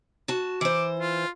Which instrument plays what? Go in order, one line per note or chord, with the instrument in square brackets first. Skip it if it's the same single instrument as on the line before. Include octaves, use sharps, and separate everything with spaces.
[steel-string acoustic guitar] F#4 A5
[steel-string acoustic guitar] E3 C5 [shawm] D6
[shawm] F4